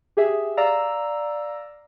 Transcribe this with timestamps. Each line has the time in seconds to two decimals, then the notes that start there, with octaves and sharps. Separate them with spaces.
0.17 G4 G#4 E5
0.57 D5 F5 A#5 E6